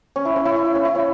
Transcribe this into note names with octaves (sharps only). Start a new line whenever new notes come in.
C#4
E4
C#4
E4
C#4
E4
C#4
E4
C#4